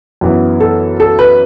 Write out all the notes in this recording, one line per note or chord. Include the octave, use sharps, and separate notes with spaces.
F#2 E3 B3
A4
A4
B4